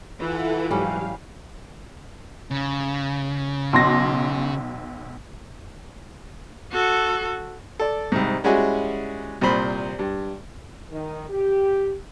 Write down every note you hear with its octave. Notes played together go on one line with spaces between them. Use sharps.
E3 F4 A4 F#5
G#2 F#3 G3 C#4 G4 F5
C#3
B1 C6 A#6
F#4 A4
A4 D5
C2 G#2
G3 G#3 C#4 E4 F#4 G#4
C2 A#2 C5 B5
G2
D#3
G4